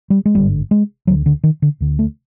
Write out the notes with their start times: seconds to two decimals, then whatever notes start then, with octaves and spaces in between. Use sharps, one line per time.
0.10 G3
0.25 G#3
0.35 G#1 G2 D3 G3
0.71 G#3
1.07 D2 D3 F#3
1.26 D3
1.44 D#3
1.62 D3
1.80 D2 D3
1.99 A3